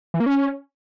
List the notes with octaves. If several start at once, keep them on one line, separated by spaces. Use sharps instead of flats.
E3
A#3
C#4